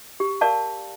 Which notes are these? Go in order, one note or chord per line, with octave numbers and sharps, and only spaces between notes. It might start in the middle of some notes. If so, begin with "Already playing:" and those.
G4
A#4 D5 F5 A5